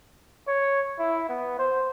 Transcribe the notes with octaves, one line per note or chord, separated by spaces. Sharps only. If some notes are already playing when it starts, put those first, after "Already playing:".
C#5
E4
B3
C5